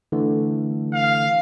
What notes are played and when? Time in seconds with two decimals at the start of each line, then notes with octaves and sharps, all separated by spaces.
0.12 D3 E3 A3
0.94 F5